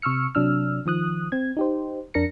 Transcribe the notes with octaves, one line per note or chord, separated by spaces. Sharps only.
C3 C#6 E6 F6 C#7
C3 F#3 D4 E6 F6
D#3 F3 D#6 F#6
C4 G#6
D#4 G4 C5
F2 D4 A#4 A#6 C#7